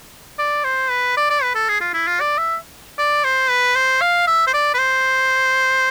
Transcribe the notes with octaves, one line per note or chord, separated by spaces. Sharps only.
D5
C5
B4
D5
D5
B4
A4
G#4
F4
E4
F4
D5
E5
D5
C5
B4
C5
F5
E5
C5
D5
B4
C5